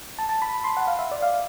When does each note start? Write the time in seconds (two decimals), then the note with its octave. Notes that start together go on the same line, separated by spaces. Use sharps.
0.19 A5
0.29 A5
0.42 B5
0.64 C6
0.77 F#5
0.87 F5
0.99 E5
1.11 D5
1.22 F5